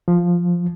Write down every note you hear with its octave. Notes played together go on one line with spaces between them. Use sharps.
F3